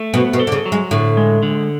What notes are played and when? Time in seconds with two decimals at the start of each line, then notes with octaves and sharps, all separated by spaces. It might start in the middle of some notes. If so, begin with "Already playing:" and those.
Already playing: A3
0.14 B2 B3
0.33 B2
0.40 A4
0.47 D3
0.52 C#3
0.66 F#3
0.72 G#3
0.91 A2 D3
1.17 G#3
1.43 D3